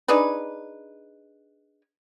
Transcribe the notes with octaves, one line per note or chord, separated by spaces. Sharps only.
D4 D#4 G#4 B4